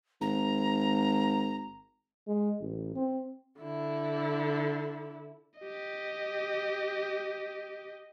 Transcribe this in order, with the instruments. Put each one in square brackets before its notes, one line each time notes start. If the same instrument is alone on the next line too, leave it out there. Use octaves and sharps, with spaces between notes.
[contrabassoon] G#1 [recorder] A#5
[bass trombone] G#3
A1
C4
[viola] D3 E4
[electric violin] G4 D#5